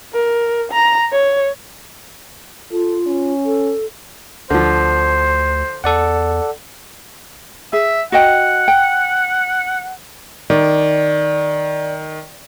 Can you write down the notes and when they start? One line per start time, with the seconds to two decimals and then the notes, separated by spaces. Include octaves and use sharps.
0.13 A#4
0.72 A#5
1.12 C#5
2.71 F4 A4
3.07 C#4
3.45 A4
4.50 D2 D3 F3 C5
5.84 E2 A4 D5 F#5
7.73 G#4 E5
8.12 F#4 D#5 F#5 G5
8.68 G5
10.50 D#3 D5